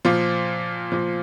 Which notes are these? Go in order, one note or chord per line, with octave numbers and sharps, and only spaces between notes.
A#2 F3 F4
A#2 F3